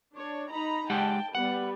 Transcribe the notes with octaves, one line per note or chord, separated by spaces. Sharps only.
D4 C#5
D#4 A#5 B5
G#3 G4 F#5 G5 A5
G3 B3 B4 F#5